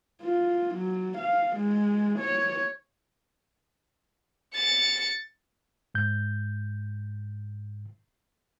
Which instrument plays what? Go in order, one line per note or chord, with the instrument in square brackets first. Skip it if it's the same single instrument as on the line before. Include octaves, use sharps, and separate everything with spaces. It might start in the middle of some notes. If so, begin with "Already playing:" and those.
[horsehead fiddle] F4
F#3
F5
G#3
C#5
[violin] A6 C#7
[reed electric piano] G#2 G6